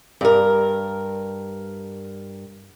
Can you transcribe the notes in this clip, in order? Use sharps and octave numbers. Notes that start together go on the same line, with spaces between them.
G2 A#4